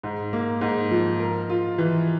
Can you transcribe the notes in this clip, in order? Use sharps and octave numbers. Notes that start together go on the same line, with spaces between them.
G#2
A#3
G#2
F3
A#4
F4
E3